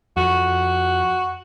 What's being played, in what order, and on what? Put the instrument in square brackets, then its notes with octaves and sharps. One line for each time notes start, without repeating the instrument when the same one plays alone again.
[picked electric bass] F2 [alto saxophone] F#4